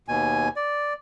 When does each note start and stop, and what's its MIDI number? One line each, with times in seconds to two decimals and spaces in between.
0.08 0.49 39
0.08 0.49 47
0.08 0.49 80
0.56 0.93 74